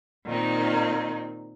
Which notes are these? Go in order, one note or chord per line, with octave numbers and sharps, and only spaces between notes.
A#2 D#3 C4 D#4